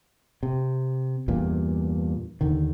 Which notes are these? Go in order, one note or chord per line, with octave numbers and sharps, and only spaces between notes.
C3
E2 G2 A#2
D#2 D3 D#3